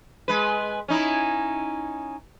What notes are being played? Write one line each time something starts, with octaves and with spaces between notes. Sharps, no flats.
G#3 B4
C#4 D#4 E4